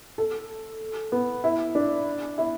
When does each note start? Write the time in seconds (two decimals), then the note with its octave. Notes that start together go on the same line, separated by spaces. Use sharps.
0.18 A4
1.12 B3
1.44 E4
1.75 D4
2.38 E4